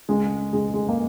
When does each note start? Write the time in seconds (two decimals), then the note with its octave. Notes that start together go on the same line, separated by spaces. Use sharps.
0.09 C#2 G#3
0.53 C#2 G#3
0.74 G#3
0.89 A#3